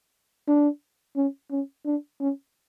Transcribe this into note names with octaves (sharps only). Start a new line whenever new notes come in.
D4
C#4
C#4
D4
C#4